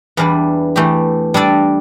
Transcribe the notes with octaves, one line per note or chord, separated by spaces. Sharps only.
E2 E3 G3 D4 B4
E3 A3 G4
G3 D4 A4 D5